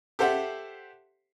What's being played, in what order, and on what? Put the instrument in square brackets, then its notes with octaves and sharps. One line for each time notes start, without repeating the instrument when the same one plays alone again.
[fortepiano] G4 A4 C5 E5 F#5